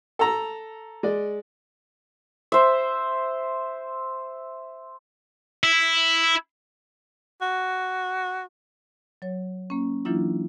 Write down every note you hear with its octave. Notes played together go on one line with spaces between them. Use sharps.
A4 A#5
G#3 D5
C5 E5
E4
F#4
F#3 C#5
A#3 C#4
E3 F#3 A#3 D4 E4 F4